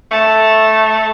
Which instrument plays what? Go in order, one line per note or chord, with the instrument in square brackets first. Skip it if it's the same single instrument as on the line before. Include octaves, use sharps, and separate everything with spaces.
[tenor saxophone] A3 [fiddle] A5